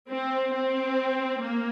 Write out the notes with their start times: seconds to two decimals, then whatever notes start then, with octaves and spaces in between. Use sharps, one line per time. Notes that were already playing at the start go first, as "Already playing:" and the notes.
0.10 C4
0.54 C4
1.41 A#3